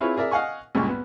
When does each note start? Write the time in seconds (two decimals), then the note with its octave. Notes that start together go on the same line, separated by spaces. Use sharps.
0.01 C4 E4 F4 G#4 B4 C#5
0.17 G#4 A#4 D5 E5
0.31 D#5 F5 F#5 G#5 C#6
0.75 C#2 G2 A#2 G#3 C#6
0.89 B3